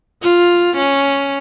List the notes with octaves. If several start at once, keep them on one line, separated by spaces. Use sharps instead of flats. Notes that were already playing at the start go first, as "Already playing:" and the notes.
F4
C#4